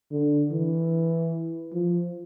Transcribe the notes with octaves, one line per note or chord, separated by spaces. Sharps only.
D3
E3
F3